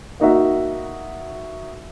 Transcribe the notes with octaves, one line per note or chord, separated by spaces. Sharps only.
A#3 D#4 F#4 E5